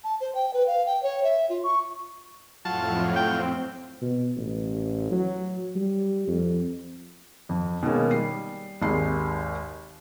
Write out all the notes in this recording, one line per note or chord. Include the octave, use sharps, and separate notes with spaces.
A5
C5
G5
B4
F5
G5
C#5
E5
F4
C#6
F2 A2 F#3 F4 A5
C4 G5
B2
A1
F#3
G3
F2
F2
B2 D#3 G#3 A#3 C#4
G3 C7
G#1 D#2 G#4 C7